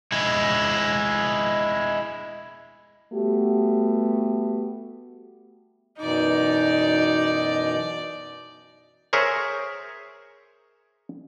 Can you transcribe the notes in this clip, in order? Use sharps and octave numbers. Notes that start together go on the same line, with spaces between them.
G#3 E4
G3 A3 B3 F#4 G4
F#2 B2 E3 D#4 D5
G#4 A#4 C5 C#5 E5